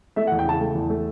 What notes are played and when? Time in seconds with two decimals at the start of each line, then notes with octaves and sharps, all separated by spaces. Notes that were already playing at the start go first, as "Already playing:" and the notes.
0.16 A3 E5
0.27 F#5
0.32 E2
0.39 G5
0.45 C#3 A5
0.60 A3
0.75 E2
0.90 A3